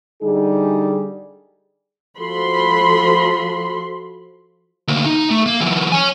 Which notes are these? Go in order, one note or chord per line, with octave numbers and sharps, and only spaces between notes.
D3 G3 D#4 G#4
F3 F#4 A4 B5 C6
D2 A#3
D#4
A3
A#3
E3 F#3
C#5 G#5